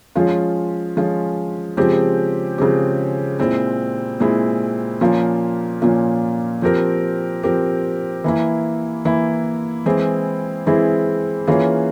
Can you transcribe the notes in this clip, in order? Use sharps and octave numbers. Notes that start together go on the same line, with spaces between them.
F3 G#3 C#4 F4
F3 G#3 C#4 F4
C#3 F3 G#3 C4 G4
C#3 F3 G#3 C4 G4
A#2 G#3 C4 E4
A#2 G#3 C4 E4
A#2 F3 A#3 C#4 F4
A#2 F3 A#3 C#4 F4
F3 C4 G4 A#4
F3 C4 G4 A#4
E3 A#3 E4
E3 A#3 E4
E3 G#3 C4 E4 G#4
E3 G#3 C4 E4 G#4
E3 A#3 C#4 F4 G#4